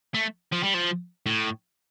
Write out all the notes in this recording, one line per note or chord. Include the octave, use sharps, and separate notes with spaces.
A3
F3
G3
F3
A2